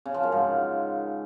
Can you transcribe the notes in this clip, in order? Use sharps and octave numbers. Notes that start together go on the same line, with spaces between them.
C#3
F3
F#2
G#2